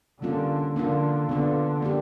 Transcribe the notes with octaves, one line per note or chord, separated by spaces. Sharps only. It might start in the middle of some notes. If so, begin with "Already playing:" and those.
D3 G3 A#3 C#4 F4
D3 A#3 D4 F4
D3 B3 D4 F4
A#3 D4 G4